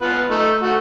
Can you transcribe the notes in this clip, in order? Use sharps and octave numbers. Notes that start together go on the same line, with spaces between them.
B3 F4 B4
A3 D#4
A3 F#4